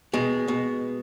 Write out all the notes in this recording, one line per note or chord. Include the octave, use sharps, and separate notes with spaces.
B2 G#3
B2